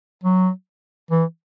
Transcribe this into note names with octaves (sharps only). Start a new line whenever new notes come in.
F#3
E3